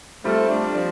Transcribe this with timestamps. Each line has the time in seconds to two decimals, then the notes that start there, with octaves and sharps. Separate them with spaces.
0.24 G3 A3 C4 F4
0.49 D4
0.76 F3